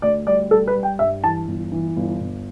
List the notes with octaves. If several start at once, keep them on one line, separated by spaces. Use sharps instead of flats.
D2 D5
G3 D5
G3 A4
B4
G3
G5
G2 E5
E3 A5
G1
E3
G1
G1